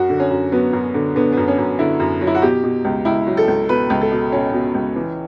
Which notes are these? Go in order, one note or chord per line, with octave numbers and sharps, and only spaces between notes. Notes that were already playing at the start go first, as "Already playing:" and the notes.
Already playing: F#2 F#4
D3
C#4
F#2
F#3 B3
F#2
D3
D3 B3
F#2 B3
C#4
F#2
D3 E4
F#2
F#3
E4
F#4
B2 G4
B2
C#2
C#2 E4
F#3
A4
C#2
B2 B4
C#2
A4
B2
B2 C#4
B2
C#2
E3